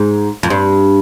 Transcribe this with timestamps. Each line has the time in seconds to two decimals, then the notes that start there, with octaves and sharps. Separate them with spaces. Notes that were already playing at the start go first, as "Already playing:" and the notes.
Already playing: G#2
0.43 F2
0.50 G2